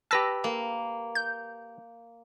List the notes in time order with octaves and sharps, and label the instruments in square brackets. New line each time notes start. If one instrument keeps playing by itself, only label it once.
[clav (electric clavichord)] G4 B4 A5 [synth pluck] E6 A#6
[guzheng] A#3
[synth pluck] G6